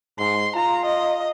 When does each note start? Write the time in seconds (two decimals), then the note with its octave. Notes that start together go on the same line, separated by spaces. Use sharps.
0.19 G#2 C6
0.56 F4 A#5
0.85 D#5